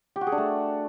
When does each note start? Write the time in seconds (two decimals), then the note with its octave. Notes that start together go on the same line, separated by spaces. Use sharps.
0.16 G4
0.21 F#4
0.27 G#4
0.32 D4
0.38 A3